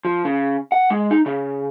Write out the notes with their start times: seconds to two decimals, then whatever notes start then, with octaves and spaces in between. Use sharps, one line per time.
0.05 F3
0.25 C#3
0.72 F#5
0.90 G#3
1.11 D#4
1.26 C#3